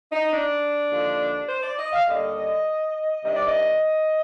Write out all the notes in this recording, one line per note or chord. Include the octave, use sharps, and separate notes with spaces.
D#4
D4
D#2 D3 F3
C5
D5
D#5
F5
D#2 D3 G3 D#5
C3 D#3 G3 D4 D#5
D5
D#5